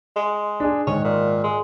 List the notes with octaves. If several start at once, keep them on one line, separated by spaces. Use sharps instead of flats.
G#3
D4 G#4
G#2 D#3 C#5 D#5
A#2
G#3